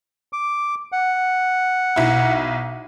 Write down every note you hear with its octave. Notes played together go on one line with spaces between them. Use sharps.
D6
F#5
B1 E4